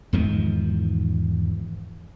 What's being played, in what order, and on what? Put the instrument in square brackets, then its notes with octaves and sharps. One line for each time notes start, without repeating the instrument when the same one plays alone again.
[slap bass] E2 G#2 D#3 F3